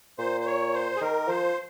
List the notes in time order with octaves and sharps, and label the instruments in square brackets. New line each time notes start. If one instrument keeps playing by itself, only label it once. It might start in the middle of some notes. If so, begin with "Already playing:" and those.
[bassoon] A#2 [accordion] C5
[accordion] C5
C#5
C5
G#4
[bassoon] D#3 [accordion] A#4
[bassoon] F3 [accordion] C5